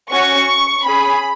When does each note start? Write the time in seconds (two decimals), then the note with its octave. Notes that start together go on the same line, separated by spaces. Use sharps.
0.10 C#4 F#4 C#6
0.85 C#4 G#4 B5